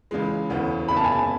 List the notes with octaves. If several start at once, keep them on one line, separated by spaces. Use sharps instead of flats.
C#2 C#3 E3 G#3
E1 D2 C#3 E3 B3
F#1 E2 C#3 B5
A5
G#5
A5